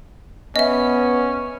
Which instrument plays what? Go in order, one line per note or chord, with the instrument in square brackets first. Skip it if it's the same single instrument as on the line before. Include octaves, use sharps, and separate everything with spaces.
[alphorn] B3 [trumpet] C#4 [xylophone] D#5 E5